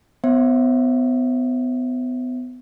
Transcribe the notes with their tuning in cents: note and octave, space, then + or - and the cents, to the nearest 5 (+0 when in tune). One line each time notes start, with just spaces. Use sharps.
B3 +30 C5 +45 E5 +0